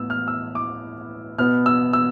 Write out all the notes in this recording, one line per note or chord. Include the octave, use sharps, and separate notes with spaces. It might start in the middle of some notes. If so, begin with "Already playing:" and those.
Already playing: A2 B3 E6
F6
E6
D6
B2 B3 F6
E6
E6